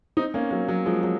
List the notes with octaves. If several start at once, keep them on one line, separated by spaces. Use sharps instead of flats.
C4 D#4
A#3 C#4
F#3 A#3
F#3
F3 G#3
F#3